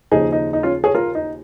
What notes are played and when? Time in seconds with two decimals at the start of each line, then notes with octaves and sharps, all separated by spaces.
0.11 D#2 C#3 F3 D#4 G#4
0.32 D#4
0.53 D#4
0.63 C#4 F4
0.84 G#4 C#5
0.95 F4 A#4
1.15 D#4